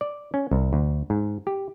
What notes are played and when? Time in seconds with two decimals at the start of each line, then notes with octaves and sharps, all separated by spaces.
0.01 D5
0.34 C#4
0.51 C2
0.73 D2
1.10 G#2
1.47 G4